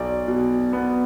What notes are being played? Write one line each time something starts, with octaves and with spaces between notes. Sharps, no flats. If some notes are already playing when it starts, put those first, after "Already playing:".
Already playing: B1 D5
B2
B3